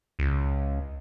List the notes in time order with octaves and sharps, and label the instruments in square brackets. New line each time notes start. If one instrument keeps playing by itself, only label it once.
[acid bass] C#2